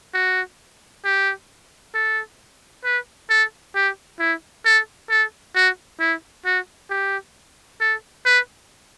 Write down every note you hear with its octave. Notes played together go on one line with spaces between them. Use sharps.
F#4
G4
A4
B4
A4
G4
E4
A4
A4
F#4
E4
F#4
G4
A4
B4